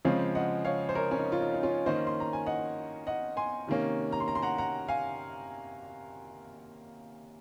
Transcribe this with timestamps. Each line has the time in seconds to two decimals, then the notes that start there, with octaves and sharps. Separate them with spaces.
0.05 C#3 F3 G#3 C4 C#5 F5
0.35 D#5 F#5
0.65 C#5 F5
0.89 C5
0.95 A#4 C#5
1.11 C#4
1.18 D#4
1.32 F4
1.41 D#4
1.54 D#4
1.63 C#4 F4
1.86 D#3 A#3 C#4 C5 D#5
2.07 C6
2.20 A#5
2.33 G#5
2.46 D#5 F#5
3.07 D#5 F#5
3.37 G#5 C6
3.67 C3 D#3 A#3 C#4
4.12 A#5
4.20 C6
4.28 A#5
4.35 C6
4.42 F#5 A#5
4.58 F#5 A#5
4.88 F5 G#5